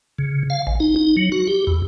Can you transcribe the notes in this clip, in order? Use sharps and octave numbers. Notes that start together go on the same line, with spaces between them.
C#3
F5
G#1
D#4
D#4
F#3
F#4
G4
E2